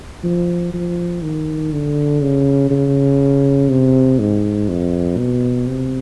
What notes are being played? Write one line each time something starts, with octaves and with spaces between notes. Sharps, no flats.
F3
F3
D#3
D3
C#3
C#3
C3
G#2
F2
B2
C3